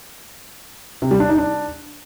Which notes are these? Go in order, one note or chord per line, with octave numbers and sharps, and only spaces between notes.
C3
G3
D4
D#4
D4